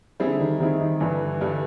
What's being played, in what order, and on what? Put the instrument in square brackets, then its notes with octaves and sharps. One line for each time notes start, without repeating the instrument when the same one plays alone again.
[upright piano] G3 C4 E4 G#4
[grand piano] D3
D#3
[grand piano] D#3 [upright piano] G3 C4 E4 G#4
[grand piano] D#3
[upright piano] G2 D3 G3 [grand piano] E3
[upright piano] G2 D3 G3